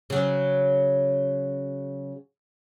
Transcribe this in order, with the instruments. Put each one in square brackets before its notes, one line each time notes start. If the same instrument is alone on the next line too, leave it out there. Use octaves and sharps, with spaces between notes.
[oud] C#3 F#3